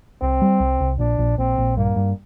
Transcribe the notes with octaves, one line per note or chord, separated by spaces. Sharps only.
C2 C4
G3
C2
C2
A#1 D4
A#1
A#1 C4
A#1
G2 A#3
G2